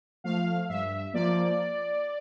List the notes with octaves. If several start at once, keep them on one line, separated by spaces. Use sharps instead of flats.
F3 A3 F5
G2 E5
F3 A#3 D5